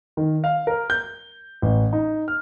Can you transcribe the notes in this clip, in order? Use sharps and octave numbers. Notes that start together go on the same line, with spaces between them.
D#3
F5
A#4
G6
A1
D#4
F6